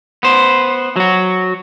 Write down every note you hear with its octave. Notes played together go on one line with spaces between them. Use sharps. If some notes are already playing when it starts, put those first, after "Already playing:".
B3 C5
F#3 F#4